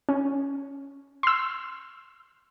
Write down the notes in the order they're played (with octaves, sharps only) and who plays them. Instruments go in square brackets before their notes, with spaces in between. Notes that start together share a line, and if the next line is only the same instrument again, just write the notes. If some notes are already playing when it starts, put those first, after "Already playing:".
[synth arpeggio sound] C#4
C6 E6